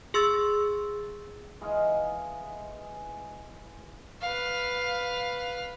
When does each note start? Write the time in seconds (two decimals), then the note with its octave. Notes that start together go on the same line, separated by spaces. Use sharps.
0.14 G#4 C6 E6 A6
1.61 E3 G#3 D#5 F5
4.22 B4 F5